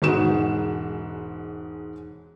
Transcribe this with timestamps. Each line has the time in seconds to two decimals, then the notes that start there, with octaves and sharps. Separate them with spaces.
0.02 E1 G#2 G#3 F#4 E7